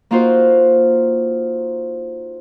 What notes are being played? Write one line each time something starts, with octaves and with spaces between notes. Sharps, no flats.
A#3 D#4 F4 F#4 C5